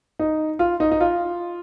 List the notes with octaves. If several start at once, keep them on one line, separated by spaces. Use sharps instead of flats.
D#4
F4
D#4
D#4
F4